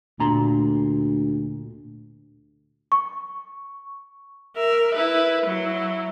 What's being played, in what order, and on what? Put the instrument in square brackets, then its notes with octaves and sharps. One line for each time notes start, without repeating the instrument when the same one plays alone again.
[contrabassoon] D2 [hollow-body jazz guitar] A#2 A#5 C6
[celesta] C#6
[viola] A#4 E5
E4 B4
F#3 E4